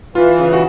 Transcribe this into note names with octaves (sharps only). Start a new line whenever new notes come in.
E3 F4
C#3
F#4